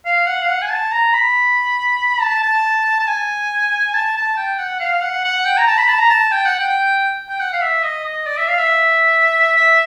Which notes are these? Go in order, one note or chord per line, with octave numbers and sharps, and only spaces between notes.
F5
F#5
F5
F#5
G#5
A5
A#5
B5
A5
A5
A5
G#5
A5
A5
G5
F#5
F5
F#5
F#5
G5
A#5
A5
B5
A5
A#5
A5
G5
F#5
G5
G5
F#5
F5
E5
D#5
D#5
D5
E5
F5
E5
E5